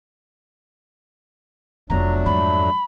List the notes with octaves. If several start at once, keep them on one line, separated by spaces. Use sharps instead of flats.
F1 F#3 A3 B3 D4 A#5
F2 G#2 B5